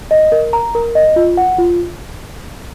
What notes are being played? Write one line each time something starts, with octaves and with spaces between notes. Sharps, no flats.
D#5
A#4
A#5
A#4
D#5
F4
F#5
F4